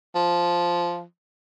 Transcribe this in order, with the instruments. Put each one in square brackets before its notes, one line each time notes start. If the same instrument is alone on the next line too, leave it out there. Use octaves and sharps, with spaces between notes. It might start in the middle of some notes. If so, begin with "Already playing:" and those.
[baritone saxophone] F3